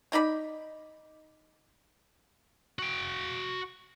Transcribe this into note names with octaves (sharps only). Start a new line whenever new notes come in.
A3 D#4 D5 B5
F#4 G5